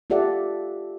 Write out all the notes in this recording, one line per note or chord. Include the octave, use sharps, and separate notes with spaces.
F4 G4 A4 D5 E5 F#5